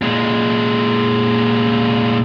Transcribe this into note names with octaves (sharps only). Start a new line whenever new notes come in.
A#2 G#3